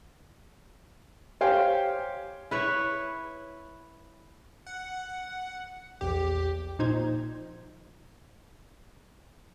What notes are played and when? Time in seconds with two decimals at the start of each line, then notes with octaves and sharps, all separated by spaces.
1.41 G4 C5 C#5 F5 G5 G#5
2.51 E4 B4 C#5
4.66 F#5
6.01 A#1 E2 G4 G5
6.79 A#2 F3 D#4 C5 G#6